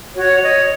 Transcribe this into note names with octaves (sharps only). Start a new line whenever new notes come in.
F#4 C#5
C#5 D#5